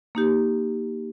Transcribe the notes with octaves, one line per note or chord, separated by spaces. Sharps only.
A#3 D#4 G4